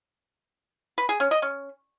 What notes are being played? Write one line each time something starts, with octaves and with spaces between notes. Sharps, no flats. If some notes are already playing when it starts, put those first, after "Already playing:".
B4
G#4
C#4
D#5
C#4